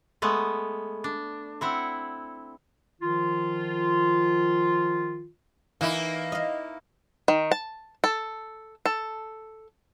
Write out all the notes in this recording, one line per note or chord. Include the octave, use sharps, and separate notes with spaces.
G#3 A3 B3
D4
C4 E4 F#5
D#3 F3 F4
E3 A#3 D#4 E4
D#5 F5
D#3
A5
A4
A4